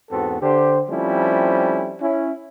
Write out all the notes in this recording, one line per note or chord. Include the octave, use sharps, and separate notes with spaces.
E2 G#2 B3 C4 F#4 A4
D3 G4 C5
F3 G3 A3 C4 C#4 E4
C#4 E4